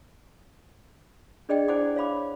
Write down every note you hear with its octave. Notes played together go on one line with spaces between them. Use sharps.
D4 G#4 D5 D#5 G5
E4 C5 D5 F#5 G#5 D6
C#5 F5 B5 D6